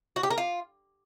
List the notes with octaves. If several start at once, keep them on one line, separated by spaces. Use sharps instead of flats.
F#4
G4
A#4
F4